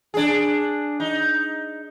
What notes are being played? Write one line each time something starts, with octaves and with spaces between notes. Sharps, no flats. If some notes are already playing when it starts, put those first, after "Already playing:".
D4 G#4
D#4